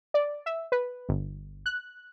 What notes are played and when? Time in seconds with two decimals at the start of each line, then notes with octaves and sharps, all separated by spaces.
0.14 D5
0.46 E5
0.72 B4
1.09 G1
1.66 F#6